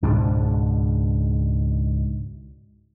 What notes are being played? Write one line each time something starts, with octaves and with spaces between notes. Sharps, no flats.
C#2 G#2 B2 D4